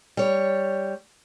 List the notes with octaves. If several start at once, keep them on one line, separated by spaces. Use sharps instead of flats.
G3 C#5